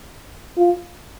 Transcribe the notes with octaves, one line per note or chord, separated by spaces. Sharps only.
F4